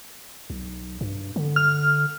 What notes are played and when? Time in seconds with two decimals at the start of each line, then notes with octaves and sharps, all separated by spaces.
0.50 B1
1.01 G2
1.36 D3
1.56 F6